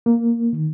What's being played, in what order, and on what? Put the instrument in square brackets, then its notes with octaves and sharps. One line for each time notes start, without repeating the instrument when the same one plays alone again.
[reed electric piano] A#3
D#3